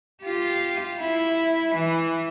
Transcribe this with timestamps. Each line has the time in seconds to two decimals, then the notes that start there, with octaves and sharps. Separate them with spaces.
0.23 F4 G4
1.00 E4
1.74 E3